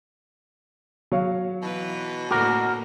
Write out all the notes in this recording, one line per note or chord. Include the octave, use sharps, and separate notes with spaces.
F#3 C#5 F5
B2 E3 B4
A2 D3 A#3 F#4 A#4 D6